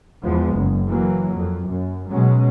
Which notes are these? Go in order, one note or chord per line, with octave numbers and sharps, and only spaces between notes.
E2 F3 G#3 B3
F#1 F#2
E3 F#3 A#3
F2
F#2
B2 F#3 G#3 C#4